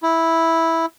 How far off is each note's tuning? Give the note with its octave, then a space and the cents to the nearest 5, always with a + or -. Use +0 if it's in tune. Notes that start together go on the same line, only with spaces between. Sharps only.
E4 -5